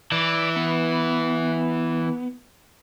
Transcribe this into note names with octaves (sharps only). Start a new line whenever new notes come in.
E3 D5
B3